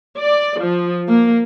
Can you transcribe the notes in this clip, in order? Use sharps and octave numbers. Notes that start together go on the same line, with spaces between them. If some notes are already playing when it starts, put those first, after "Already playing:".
D5
F3
A#3